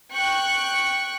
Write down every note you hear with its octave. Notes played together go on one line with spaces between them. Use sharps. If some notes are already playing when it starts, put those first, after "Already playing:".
G5 C#6 F#6